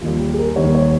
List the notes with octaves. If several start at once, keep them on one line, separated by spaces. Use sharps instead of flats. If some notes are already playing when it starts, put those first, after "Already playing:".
D#2 D#3 G3 F4
G4
G#4
A#4
D#2 D#3 G3 C#5
C#5